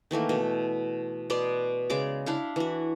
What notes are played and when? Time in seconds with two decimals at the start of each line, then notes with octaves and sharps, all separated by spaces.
0.11 D#3 E3 A3 A#3
0.29 B2 A3
1.30 B2 B3 D5 C6
1.90 C#3 G#3 D5 D6
2.26 D4 E4 F5
2.56 E3 F#4